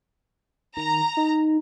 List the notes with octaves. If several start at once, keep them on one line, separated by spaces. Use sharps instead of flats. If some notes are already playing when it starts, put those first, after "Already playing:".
D#3 A#5
D#4